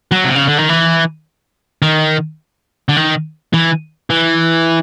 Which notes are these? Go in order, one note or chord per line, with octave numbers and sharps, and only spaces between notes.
F#3
C3
C#3
D3
D#3
E3
D#3
D3
D#3
E3
E3